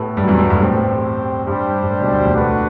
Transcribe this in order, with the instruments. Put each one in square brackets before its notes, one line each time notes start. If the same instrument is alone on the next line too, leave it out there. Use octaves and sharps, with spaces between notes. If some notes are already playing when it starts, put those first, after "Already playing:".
Already playing: [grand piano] A2 A3 [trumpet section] B3 E4 G4 B4
[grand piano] G2 G3
F#3
E2 E3
B2
A2
G2
[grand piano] A2 [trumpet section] C4 G4 C5
[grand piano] G2 [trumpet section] G3 D4 G4 C5
[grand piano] G2
A2
B1 B2
D2 D3
E2 E3
[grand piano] D2 D3 [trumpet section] D4 F#4 B4 F#5